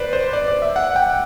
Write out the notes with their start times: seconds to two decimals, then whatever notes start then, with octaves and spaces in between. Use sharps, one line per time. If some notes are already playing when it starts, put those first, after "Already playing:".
Already playing: B4 C5 D5
0.13 C5
0.33 D5
0.48 D5
0.62 E5
0.76 F#5
0.96 G5